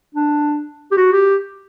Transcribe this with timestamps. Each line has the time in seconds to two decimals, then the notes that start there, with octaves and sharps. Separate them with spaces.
0.15 D4
0.92 G4
0.97 F#4
1.13 G4